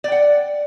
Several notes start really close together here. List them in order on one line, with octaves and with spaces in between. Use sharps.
D5 G5 F#5